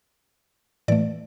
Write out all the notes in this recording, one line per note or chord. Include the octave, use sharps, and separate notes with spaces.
A2 E3 A3 D5